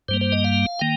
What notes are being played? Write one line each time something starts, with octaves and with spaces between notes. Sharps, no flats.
G2 G3 A#3 C5
C5
D#5
F5
D#3 A#3 G5